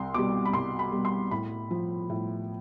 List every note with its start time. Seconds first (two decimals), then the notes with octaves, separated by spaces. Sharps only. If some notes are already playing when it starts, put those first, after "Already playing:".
Already playing: C2 C6
0.14 B2 G3 D6
0.45 B5
0.53 C2 C6
0.79 B5
0.92 B2 G3
1.05 C6
1.31 A2 B5
1.71 F3
2.10 A2